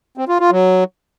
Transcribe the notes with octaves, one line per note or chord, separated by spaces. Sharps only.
C4
F4
F4
F#3